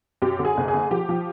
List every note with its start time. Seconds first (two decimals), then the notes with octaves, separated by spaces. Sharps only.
0.22 F#2 G4
0.39 D3
0.45 G#4
0.57 F#1
0.68 G#4
0.74 D3
0.91 F3 G4
1.09 F3